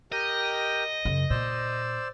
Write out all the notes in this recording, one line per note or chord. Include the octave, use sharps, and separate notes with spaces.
G4 A#4 D#5 G5
F#2 C#3
A#2 C5 D5 E6